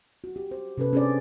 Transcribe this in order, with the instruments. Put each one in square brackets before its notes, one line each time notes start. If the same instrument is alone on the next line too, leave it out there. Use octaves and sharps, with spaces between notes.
[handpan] F#4
G4
C5
C3 C#4 A4 B4
C#4 D4 G#4 C5 D5